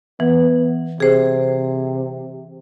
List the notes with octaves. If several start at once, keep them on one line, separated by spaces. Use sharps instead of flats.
E3 B3
C3 G#4 C5